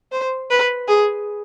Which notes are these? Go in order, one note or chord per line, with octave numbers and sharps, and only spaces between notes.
C5
B4
G#4